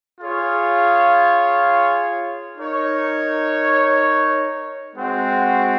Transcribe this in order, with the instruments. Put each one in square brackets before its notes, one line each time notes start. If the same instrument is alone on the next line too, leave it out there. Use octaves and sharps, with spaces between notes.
[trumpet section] F4 G#4 C#5 F5
D#4 A#4 C#5
G#3 C4 F#4 C5 F#5